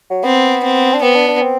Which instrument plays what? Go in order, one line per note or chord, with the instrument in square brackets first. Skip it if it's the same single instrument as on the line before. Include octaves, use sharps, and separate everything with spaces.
[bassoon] F#3
[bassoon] B3 [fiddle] C4
[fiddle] C4
[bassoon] D4
[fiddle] B3 [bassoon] C4
[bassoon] D4
D4
C4